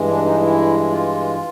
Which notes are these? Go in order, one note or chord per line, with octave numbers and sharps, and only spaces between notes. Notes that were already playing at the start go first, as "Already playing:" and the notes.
Already playing: G2 E3 G#3
D4
D#4
E4
F4